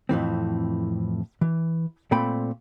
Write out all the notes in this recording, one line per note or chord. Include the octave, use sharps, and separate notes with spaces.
F2 A2 E3 C4
E3
A#2 A3 C4 G5 B5